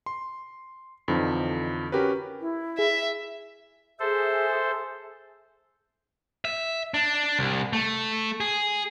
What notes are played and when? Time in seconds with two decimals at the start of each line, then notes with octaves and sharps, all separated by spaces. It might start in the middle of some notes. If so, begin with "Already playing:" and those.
0.06 C6
1.08 F2 D3 E3 F3 D#4
1.92 C#4 F#4 G4 A#4 B4
2.40 E4
2.79 G#4 E5
4.00 G#4 A4 C5 E5
6.45 E5
6.94 D4
7.39 C2
7.73 A3
8.40 G#4